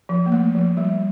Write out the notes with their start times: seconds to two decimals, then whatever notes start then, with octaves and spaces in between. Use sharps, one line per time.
0.09 F3
0.26 A#3
0.32 A3
0.55 F3
0.77 G3